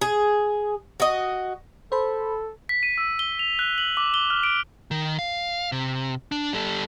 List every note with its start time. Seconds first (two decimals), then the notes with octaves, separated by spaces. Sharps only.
0.01 G#4
1.00 F#4 D#5
1.92 A4 C5 B5
2.69 B6
2.83 D#7
2.98 E6
3.19 G7
3.39 F7
3.59 F#6
3.78 F#7
3.97 D6
4.14 G7
4.30 F6
4.44 D7
4.91 D#3
5.19 F5
5.72 C3
6.32 D4
6.53 G3 A4